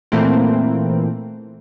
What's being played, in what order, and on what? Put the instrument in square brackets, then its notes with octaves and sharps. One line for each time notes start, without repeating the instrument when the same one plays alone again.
[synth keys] A#2 E3 A3 A#3 C4